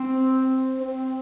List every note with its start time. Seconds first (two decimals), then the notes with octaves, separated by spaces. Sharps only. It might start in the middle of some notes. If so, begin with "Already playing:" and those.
Already playing: C4
0.79 C4